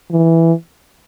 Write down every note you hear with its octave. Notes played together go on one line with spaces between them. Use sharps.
E3